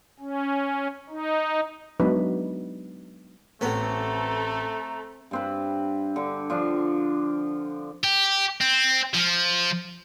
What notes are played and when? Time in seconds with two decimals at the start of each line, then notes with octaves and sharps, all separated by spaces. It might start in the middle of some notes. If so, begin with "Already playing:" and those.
0.20 C#4
1.10 D#4
2.00 F#3 G#3 B3 D4 D#4 B4
3.61 A1 A3 B3 C4 A4 A#5
5.31 G2 C4 B4
6.16 D3
6.50 F3 D4
8.04 G4
8.61 C4
9.14 F3